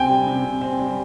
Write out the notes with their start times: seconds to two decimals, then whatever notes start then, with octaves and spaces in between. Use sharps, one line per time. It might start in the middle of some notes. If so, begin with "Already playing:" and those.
Already playing: C3 C4 G5 G#5
0.09 G3
0.27 C3
0.45 C3
0.61 C4
0.79 G3